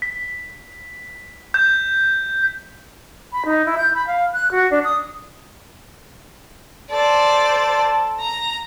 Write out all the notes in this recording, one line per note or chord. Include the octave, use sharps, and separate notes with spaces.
B6
G6
B5
D#4
E4
G6
B5
F5
F#6
F#4
D4
D#6
A4 C5 D5
A#5